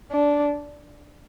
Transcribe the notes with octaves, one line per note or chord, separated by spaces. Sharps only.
D4